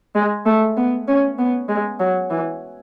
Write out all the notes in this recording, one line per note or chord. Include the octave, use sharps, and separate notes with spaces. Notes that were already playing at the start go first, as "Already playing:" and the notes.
G#3
A3
B3
C#4
B3
G#3
F#3
E3